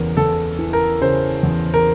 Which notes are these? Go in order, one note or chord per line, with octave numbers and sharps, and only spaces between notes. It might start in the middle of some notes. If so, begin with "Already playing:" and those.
Already playing: E2 C#3 A#4
E2 A4
E3
A#4
C#3 C5
E2
A#4